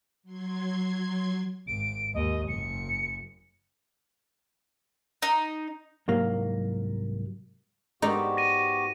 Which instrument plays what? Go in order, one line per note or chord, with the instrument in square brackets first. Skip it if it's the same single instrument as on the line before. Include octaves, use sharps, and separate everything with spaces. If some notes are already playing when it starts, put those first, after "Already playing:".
[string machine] F#3 C6 G#6
[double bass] G#1 [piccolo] D7
[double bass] D#2 G#2 [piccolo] D#5
[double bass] F#1 [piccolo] C#7
[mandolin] D#4
[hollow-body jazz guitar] C2 G#2 F#3 A#3
[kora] G#2 [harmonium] B3 F#4 G4 [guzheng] D#4 D5
[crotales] A#6 D#7